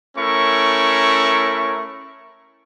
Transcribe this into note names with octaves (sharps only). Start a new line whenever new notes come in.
A3 C#4 E4 A#4 C#6